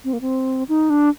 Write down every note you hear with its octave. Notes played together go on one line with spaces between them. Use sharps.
C4
A#3
C4
D#4
D4